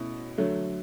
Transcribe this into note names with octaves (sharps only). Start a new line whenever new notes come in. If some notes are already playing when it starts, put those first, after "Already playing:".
Already playing: B2 A3 C#4 E4
D3 F#3 A3